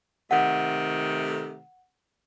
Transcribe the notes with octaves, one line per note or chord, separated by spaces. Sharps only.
C3 D#3 A3 F#5